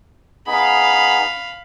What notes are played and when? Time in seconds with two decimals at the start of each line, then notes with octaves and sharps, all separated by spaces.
0.47 B3 D#4 G#4 F5 B5